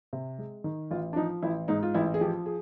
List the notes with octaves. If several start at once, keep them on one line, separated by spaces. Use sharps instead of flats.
C3
G#3
D#3
A1 F4
D4
F3 D#4
A1 E4
G#2 D#4
F4
A1 E4
G#4
F3 G4
G#4